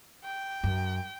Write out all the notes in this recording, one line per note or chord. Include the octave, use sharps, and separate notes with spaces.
G5
F#2